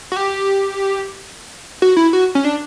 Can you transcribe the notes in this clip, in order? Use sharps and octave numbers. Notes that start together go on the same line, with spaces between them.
F#4
G4
F#4
E4
F#4
C#4
D4